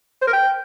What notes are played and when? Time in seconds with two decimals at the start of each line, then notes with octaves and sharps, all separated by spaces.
0.22 C5
0.27 A#4
0.33 G5